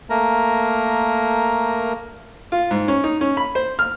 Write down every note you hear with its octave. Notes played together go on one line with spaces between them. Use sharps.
A3 A#3 A#4 A#5
F4
G#2
C#4
D#4
C#4
B5
C5
F6